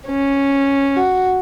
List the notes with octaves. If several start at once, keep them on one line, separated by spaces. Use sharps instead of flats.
C#4
F#4